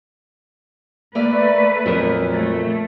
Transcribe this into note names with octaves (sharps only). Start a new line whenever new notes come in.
A3 A#3 B4 D5 E5
F2 A#2 F#3 A#4
A3